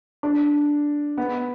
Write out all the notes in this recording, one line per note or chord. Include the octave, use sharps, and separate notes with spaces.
D4
B3